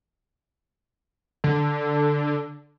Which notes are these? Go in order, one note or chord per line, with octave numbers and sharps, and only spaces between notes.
D3